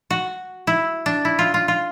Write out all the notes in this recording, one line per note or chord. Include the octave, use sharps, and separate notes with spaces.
F#4
E4
D4
E4
F4
F4
F4